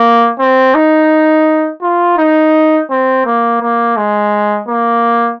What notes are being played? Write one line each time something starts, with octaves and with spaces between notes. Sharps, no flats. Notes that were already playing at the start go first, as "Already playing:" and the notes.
Already playing: A#3
C4
D#4
F4
D#4
C4
A#3
A#3
G#3
A#3